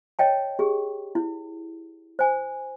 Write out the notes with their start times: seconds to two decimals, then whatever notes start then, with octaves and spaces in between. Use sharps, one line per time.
0.19 C#5 D#5 G5 A5
0.59 G4 G#4
1.15 E4
2.19 C5 G#5